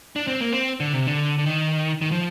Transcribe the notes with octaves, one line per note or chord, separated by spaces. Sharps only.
D4
C4
A#3
C4
D3
C3
D3
D3
D#3
D#3
F3